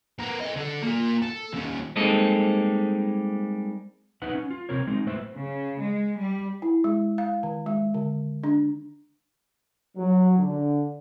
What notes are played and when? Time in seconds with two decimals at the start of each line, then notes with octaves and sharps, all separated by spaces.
0.19 B3 A#4
0.40 A4 D#5
0.56 D3 A4
0.83 A#3 F4
1.22 A4
1.53 D#2 C#4
1.96 G3 G#3 A#3 C4 D#4 A4
4.22 D#4 B4 E5 F#5
4.34 C#4
4.50 F4
4.69 C3 C4 A#4 C#5
4.87 G#3 C4 D#4
5.06 A2 A3 B4 C5 E5
5.35 C#3
5.79 G#3
6.18 G3
6.62 E4
6.84 G#3
7.18 F5
7.43 D#3
7.66 G#3
7.94 D3
8.44 D4
9.97 F#3
10.39 D3